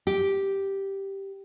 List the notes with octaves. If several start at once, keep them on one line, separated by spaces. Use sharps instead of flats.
G4